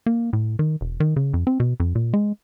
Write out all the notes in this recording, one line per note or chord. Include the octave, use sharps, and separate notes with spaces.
A#3
A2
D#3
E1
D#3
C#3
F2
C4
B2
F2
A#2
G#3